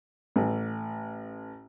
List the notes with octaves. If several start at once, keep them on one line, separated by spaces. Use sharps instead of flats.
A1